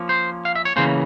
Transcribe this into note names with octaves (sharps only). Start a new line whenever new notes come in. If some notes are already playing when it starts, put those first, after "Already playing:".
Already playing: F3 A#3 C#4
C5
F5
E5
C#5
C#3 E3 A#3 C#4 C5